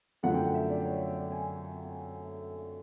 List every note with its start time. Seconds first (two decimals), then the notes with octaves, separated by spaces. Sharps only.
0.23 F#2 D3 F3 A3 F#5
0.34 G5
0.44 F#5
0.54 E5
0.70 D5
0.85 C#5
1.17 D5
1.32 G#5